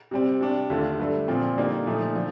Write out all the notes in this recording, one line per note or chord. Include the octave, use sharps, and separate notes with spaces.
C3 G3 C4
C3 G3 D4
D#2 D3 A3 D4 F4
G2 D3 A3
A#2 F3 C4 F4
D3 G3 A#3 D#4
A#2 F3 A3 D#4
D3 F3